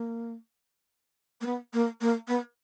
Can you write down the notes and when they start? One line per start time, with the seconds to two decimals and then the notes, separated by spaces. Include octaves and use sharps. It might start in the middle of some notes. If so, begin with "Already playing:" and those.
Already playing: A#3
1.41 A#3
1.46 B3
1.73 A#3
2.01 A#3
2.28 B3